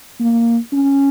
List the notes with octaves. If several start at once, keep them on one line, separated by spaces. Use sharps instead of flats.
A#3
C#4